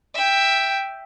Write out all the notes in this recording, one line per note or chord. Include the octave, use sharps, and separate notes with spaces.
E5 G5